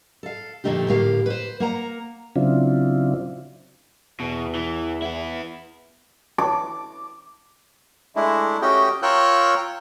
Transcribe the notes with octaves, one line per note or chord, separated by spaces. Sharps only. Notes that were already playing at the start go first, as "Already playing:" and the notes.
A4 F5
F2 A#2 D3 A3 D#4 G4
D2 A2 A#3 G4 F5
B4 C5
A#3 F#5 A#5
C#3 F#3 C4 D4 E4 F4
E2 B2
E3
B3 E4
D6
G#3 A3 D4 E4
A3 C#4 F#4 G4 D#5 G5
F4 A#4 C#5 G5 E6 F#6